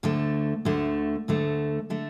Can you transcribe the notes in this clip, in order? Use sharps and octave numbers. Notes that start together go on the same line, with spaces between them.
D2 D3 A3
D2 D3 A3
D2 D3 A3
D3 A3